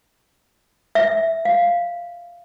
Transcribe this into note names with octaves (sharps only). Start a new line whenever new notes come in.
E5
F5